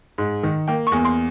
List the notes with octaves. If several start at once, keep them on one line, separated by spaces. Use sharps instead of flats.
G#2
D#3
A#3 G5
C#6
E2
C6